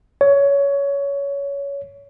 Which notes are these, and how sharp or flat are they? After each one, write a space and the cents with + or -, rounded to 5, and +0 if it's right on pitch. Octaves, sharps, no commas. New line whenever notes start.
C#5 +20